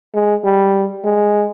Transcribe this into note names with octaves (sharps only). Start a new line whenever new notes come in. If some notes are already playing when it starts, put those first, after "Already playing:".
G#3
G3
G#3